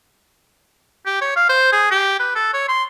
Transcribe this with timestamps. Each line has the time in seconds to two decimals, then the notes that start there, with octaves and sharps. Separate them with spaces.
1.06 G4
1.21 C#5
1.36 F5
1.49 C5
1.72 G#4
1.91 G4
2.19 B4
2.36 A4
2.54 C#5
2.68 C6